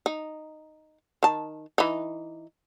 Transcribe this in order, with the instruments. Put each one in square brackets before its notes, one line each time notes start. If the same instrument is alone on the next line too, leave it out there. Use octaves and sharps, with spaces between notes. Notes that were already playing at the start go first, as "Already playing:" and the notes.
[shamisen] D#4
D#3 A5
E3 D#4